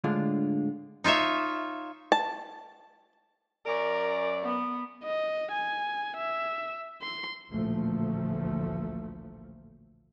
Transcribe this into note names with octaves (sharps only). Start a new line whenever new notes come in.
A2 D3 G#3 D4 F4
D#4 F4 C#5 E5
A5
F#2 A#4 D5
B3
D#5
G#5
E5
C6
A1 D2 A#2 F3 A3 A#3